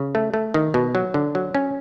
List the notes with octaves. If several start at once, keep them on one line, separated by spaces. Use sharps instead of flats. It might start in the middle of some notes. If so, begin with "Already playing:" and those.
Already playing: C#3
A3
A3
D#3
B2
F#3
D3
F#3
C#4